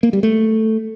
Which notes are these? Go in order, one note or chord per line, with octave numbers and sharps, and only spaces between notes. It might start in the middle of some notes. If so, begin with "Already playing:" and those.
A#3
G3
A3